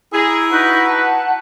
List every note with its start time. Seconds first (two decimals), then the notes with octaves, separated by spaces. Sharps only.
0.13 E4 G#4 A#5
0.51 D#4 F#4 B4 A#5
0.87 F#5 A5